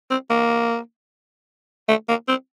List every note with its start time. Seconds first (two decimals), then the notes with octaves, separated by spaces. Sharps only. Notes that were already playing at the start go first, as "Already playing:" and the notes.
0.10 C4
0.30 A#3
1.89 A3
2.08 A#3
2.28 C4